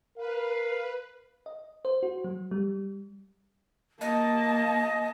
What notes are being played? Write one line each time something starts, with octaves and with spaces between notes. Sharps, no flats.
A#4 B4 F5
D#5
C5
F#4
F#3
G3
A#3 D#5 A5